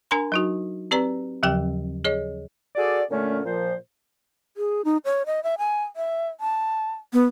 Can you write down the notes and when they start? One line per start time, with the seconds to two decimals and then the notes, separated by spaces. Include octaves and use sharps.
0.11 D4 A#4 G#5 A#5 C6
0.32 F#3 D#4 F#4
0.91 C4 G4 B4 D5 A#5
1.43 D#2 C#3 F3 F#3 G4 G5
2.05 G#4 C#5 D#5
2.75 F#4 G#4 A4 D5
3.10 A#2 D3 A3 C#4
3.44 A#2 F3 C5
4.57 G#4
4.85 D#4
5.05 C#5
5.26 D#5
5.43 E5
5.58 G#5
5.96 E5
6.41 A5
7.13 B3